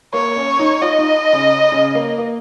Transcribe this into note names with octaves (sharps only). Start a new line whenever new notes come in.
A#3 C#5
C#4
D#4
F4 D#5
D#4
C#3
C#3
A#3
A#3